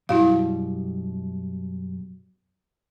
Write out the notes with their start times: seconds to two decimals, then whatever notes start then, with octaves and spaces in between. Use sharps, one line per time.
0.09 F#2 B2 G3 E4 F#4 F5